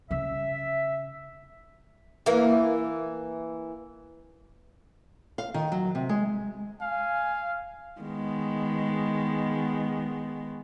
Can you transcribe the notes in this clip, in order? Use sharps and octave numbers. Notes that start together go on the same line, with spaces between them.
C#3 E5
E3 A#3
F5
D#3
F#3
C3
G#3
F5 G#5
D#3 G#3 B3